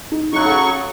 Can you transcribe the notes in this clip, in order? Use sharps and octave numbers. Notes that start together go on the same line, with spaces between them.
D#4
C#3 F#3 D#4 C#6 F#6
A4 F#5